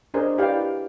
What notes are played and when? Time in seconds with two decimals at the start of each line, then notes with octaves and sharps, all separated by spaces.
0.14 D4 G#4 A#4 C5 D#5
0.38 E4 G4 B4 D5 F5 G5